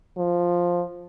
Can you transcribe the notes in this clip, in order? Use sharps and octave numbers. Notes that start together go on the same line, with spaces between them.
F3